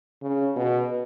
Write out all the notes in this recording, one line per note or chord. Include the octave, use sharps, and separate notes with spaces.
C#3
B2